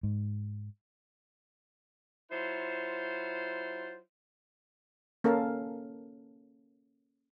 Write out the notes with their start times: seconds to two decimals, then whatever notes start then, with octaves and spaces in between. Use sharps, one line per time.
0.03 G#2
2.31 F#3 E4 F4 C5
5.24 A#3 C#4 A4 A#4 F5 A5